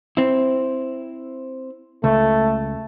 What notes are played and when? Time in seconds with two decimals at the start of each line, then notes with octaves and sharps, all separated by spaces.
0.17 C4 E4
2.04 C#2 A3